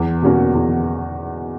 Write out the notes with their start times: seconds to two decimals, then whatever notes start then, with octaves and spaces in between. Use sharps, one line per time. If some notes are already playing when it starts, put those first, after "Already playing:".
Already playing: E2
0.22 B2 A#3 C#4 F#4
0.54 E2